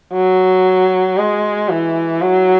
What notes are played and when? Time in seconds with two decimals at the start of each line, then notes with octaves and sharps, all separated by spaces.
0.13 F#3
1.17 G#3
1.69 E3
2.21 F#3